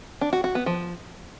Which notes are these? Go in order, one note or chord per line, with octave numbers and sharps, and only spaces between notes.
D4
F#4
F#4
B3
F3